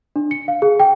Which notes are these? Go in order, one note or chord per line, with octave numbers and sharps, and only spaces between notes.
D4
C#7
F5
G#4
G5